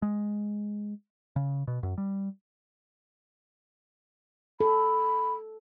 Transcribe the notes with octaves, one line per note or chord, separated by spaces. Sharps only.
G#3
C#3
B2
F#2
G3
A4 B5